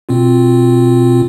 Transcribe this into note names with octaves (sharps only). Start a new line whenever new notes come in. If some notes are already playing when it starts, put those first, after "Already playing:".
B2 C4 F4